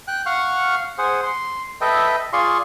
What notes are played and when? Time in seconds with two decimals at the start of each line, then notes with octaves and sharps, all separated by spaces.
0.08 G5 F#6
0.26 F5 F#5 C#6 F6
0.98 G#4 C5 F#5
1.23 C6
1.81 A4 B4 D#5 E5 G5
2.33 F4 G#4 D5 F5 C6 C#6